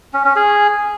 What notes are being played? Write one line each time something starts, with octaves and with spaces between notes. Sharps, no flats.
C#4
C#4
G#4